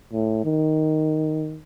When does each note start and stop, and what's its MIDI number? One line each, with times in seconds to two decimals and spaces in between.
0.13 0.41 45
0.45 1.60 51